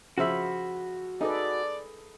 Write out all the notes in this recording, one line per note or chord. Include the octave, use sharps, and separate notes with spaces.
C#3 F3 F#4 E5 B5
D#4 G#4 A4 B4 D5